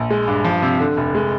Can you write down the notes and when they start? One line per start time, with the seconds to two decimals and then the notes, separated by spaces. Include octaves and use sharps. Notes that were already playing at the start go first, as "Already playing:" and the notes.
Already playing: A#1
0.10 G#3
0.27 G2
0.45 F3
0.62 C3
0.80 D3
0.97 F1
1.15 G#3